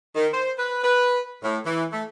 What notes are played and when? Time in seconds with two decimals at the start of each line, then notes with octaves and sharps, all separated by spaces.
0.16 D#3
0.33 C5
0.58 B4
0.84 B4
1.43 A2
1.65 E3
1.92 A3